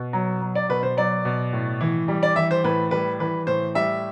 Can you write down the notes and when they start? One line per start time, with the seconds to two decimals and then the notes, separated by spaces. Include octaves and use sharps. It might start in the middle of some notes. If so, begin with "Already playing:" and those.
Already playing: B2
0.13 F#3
0.42 F#3
0.55 D5
0.69 B2 B4
0.83 C5
0.97 F#3 D5
1.25 B2
1.53 A2
1.81 E3
2.08 G3
2.23 D5
2.36 E3 E5
2.51 C5
2.64 A2 B4
2.91 G3 B4
3.19 E3 B4
3.47 A2 C5
3.75 G3 E5